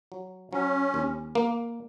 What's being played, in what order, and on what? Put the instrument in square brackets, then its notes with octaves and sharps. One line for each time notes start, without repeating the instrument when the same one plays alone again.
[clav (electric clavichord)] F#3
[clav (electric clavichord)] F#3 [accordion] C#4
[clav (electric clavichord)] D#2
A#3